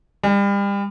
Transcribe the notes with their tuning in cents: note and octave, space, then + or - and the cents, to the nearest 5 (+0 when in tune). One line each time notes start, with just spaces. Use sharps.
G3 +35